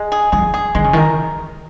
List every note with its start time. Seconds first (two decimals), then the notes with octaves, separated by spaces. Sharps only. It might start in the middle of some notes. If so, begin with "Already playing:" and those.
Already playing: G#3
0.12 G#4
0.32 F3 G#4
0.54 G#4
0.75 D#3 G#3
0.84 C#3
0.93 D#3
0.97 A#4